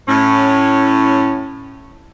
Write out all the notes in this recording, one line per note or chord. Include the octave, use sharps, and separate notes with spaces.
A2 C#4